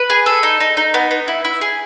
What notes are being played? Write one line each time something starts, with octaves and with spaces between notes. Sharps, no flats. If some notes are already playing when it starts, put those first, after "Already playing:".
Already playing: B4
G#4
A4
D#4
D#4
D#4
B3
B3
E4
E4
G#4